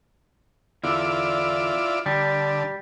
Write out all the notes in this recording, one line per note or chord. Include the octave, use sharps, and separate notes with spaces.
E2 D3 E4 F4 D5
D3 G3